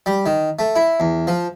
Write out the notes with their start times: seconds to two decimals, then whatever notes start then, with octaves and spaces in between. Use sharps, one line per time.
0.06 G3
0.26 D#3
0.59 A3
0.76 E4
1.00 E2
1.27 F3